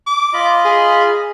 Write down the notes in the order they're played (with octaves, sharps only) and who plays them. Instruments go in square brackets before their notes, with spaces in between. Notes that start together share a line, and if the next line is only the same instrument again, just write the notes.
[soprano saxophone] D6
[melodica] F4 D#5 B5
[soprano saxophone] G#4